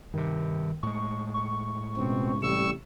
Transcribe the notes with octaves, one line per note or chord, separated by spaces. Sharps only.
G2 C3 D#3
A2 G#3 C#6
C#6
C#2 B2 C4
A1 C3 G3 C#6 E6